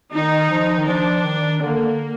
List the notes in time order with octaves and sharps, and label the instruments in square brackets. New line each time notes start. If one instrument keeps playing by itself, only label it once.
[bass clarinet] D#3 [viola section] D#4
[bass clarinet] F3
D#3
[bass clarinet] F3 [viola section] D4
[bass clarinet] D#3
[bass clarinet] D3 [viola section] A#3